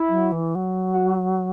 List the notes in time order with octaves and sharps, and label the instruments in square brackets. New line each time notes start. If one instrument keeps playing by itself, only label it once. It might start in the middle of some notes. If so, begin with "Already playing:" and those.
Already playing: [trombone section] E4
[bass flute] F#3
E3
F#3
[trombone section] F#4